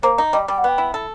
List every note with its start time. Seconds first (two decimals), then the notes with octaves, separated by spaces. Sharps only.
0.03 A#3 C5
0.18 D#4
0.33 G3 D#5
0.48 G3 G5
0.58 F#5
0.64 B3 G5
0.78 E4
0.94 A4